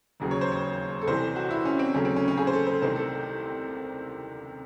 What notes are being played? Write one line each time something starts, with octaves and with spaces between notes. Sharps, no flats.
E1 D#2 C#3 F#3
C#5
C5
C#5
A4
C2 C3 E3 C5
F#4
E4
C#4
C4
D#2 C#3 F#3 A3 C#4
C4
C#4
C#4
G#4
C5
A4
C5
C2 C3 D#3 A3 C5
A4